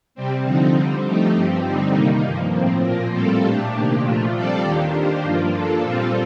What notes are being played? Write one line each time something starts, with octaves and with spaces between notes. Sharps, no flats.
C3 G3 C4
D3 F3 C4 D#4
D3 G3 C4
F3 A3 D#4 G4
G2 F3 C4 G4
D3 G3 C4 D#4
C3 D#3 G3 A#3 D#4
G2 F3 A#3
A2 F3 C4
A#2 F3 A#3 F4 A#4
A2 G3 C4 F4 A4
A#2 A3 D4 G4
C3 D#3 A#3 D4 G4
A#2 F3 A3 D4 F4
G3 C4 F4 A4 D5
D#2 D#3 A#3 D4 G4
D#3 A#3 D4 G4 C5
G2 F3 A#3 F4
F3 A#3 D4 A4
A#2 G3 C4 F4 A4